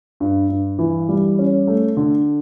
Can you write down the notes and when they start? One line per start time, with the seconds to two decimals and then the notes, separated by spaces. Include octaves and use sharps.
0.20 G2
0.49 G2
0.79 E3
1.09 G3
1.39 C#4
1.67 A3
1.97 D3